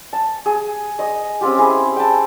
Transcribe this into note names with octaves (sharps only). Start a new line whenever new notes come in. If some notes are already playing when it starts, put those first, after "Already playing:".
A5
G#4
D#5 D#6
C4 C#4 F4 G4
E4 G#4
G5 A5